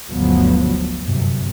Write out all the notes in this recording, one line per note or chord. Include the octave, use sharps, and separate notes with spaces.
G1 D2 D3 F3 F#3 B3
G1 F#2 C3